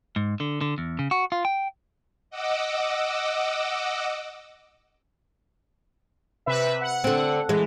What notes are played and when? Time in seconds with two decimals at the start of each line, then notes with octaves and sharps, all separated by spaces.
0.16 G#2
0.40 D3
0.61 D3
0.78 E2
0.99 C#3
1.11 F#4
1.32 F4
1.45 G5
2.30 D#5 F#5 D6 E6
6.46 C3 B4 E5
6.81 F#5
7.04 D3 C4
7.49 E3 G#3